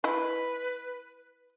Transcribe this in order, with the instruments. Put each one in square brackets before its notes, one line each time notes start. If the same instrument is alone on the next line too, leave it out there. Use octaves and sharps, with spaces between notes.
[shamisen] E4 D#5 [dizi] B4